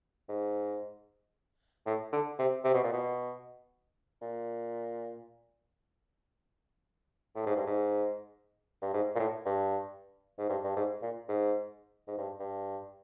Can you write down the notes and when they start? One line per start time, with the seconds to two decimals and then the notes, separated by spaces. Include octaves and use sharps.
0.29 G#2
1.86 A2
2.12 D3
2.39 C3
2.64 C3
2.74 B2
2.84 A#2
2.93 B2
4.22 A#2
7.35 A2
7.46 G#2
7.56 G2
7.67 G#2
8.82 G2
8.94 G#2
9.15 A#2
9.19 A2
9.46 G2
10.39 G#2
10.49 G2
10.64 G2
10.76 G#2
11.02 A#2
11.28 G#2
12.08 G#2
12.18 G2
12.40 G2